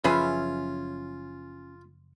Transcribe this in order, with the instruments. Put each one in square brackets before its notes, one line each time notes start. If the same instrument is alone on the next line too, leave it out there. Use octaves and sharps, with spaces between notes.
[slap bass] F#1 F3 F#3 [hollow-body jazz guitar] C#4 [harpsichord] F4 [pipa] G#4 B4 E5